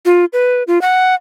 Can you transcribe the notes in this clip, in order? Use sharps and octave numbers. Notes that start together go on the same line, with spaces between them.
F4
B4
F4
F#5